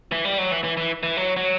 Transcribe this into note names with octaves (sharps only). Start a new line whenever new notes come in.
E3
G3
F#3
E3
E3
E3
E3
F#3
F#3